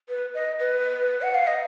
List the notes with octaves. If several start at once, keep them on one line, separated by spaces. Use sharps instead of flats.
B4
D#5
B4
F#5
F5
D#5